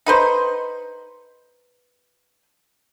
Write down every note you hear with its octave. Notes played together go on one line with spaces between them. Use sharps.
D#4 B4 C5